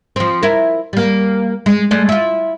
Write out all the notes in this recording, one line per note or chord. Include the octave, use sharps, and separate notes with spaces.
F3 C4
E4 A#4
G3 A#3
G#3
G#3 A3 D5
E4 F4